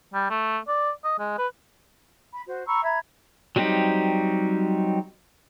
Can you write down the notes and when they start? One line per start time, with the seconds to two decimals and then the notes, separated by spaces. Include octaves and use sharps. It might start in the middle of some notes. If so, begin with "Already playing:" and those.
0.14 G3
0.30 A3
0.68 D5
1.04 D#5
1.19 G#3
1.38 B4
2.32 B5
2.47 F#4 C5
2.67 A#5 B5 C#6 E6
2.83 E5 A#5 B5 G#6
3.56 F#3 G3 C4 D#4 G4